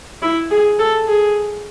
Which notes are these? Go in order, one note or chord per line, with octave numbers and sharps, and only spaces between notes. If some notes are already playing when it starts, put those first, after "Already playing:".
E4
G#4
A4
G#4